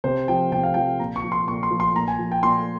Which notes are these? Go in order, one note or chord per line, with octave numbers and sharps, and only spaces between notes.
C3 C5
F3 G5
C3 G5
F5
F3 G5
A#2 A#5
C#6
F3
C6
A#2 C#6
C6
F3
C6
A#2 A#5
G#5
F3
G5
A#2 C6